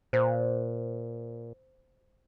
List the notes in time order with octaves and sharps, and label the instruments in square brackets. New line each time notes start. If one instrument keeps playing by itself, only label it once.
[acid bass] A#2 [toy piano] C5